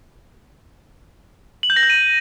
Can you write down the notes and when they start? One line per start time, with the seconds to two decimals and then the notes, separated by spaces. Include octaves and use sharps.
1.63 F#7
1.70 G6
1.76 A#6
1.83 G6
1.90 D#7